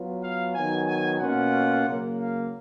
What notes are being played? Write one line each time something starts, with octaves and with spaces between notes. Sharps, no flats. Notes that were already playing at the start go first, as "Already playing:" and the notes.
Already playing: F#3 B3 F4
F5
D#3 F#3 B3 G#5
G#5
B2 A#3 C#4 F4 F#5
C#3 F#3 A#3
F5